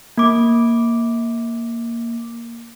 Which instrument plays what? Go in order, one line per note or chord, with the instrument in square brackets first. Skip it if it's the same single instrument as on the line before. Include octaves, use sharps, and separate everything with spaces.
[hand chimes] A#3 D6